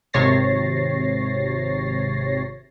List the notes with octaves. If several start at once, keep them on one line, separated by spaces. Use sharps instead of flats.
G#1 C3 C#5 A6 A#6 C7